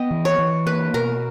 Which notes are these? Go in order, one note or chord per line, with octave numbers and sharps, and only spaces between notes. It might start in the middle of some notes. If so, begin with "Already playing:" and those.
Already playing: B3 D#5 G5
E3
C#5
E3
A#3 B4
B2 A#4